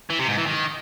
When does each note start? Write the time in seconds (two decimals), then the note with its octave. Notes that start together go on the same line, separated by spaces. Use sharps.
0.10 E3
0.19 C3
0.28 G#2
0.37 E3
0.47 D#3